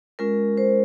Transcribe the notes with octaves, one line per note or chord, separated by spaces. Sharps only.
G#3 C#4 F4 A#4
C5